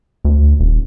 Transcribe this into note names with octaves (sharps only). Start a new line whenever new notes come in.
D2
D#1